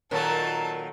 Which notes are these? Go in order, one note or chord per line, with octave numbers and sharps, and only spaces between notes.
A#2 D#3 F#3 A4 A5